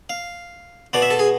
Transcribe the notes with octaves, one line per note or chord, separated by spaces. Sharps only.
F5
B2 B3 D5
E5
A4
G#4